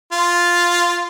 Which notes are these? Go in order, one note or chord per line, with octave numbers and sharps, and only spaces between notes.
F4